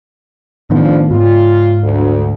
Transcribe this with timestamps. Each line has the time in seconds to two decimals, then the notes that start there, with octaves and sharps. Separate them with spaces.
0.70 F2 A2 D#3 F3 B3 D4
1.11 G#2 F4
1.83 D2